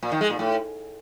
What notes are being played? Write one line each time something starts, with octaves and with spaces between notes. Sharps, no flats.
A#2
D#3
G#3
A#2
A2